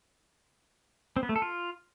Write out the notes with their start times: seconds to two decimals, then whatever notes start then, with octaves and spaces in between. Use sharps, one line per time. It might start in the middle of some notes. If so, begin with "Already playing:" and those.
1.16 C4
1.23 B3
1.29 A3
1.36 A4
1.42 F4